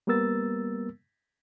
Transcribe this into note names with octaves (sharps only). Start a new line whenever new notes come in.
G3 A#3 B3 A#4 E6 A6